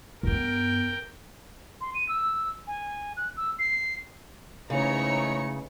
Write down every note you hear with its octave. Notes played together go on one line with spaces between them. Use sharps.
G2 B3 A#4 G5
C6
D#7
E6
G#5
F#6
E6
C7
G#2 C#3 E3 A3 D#4 C#5 A#5 C#7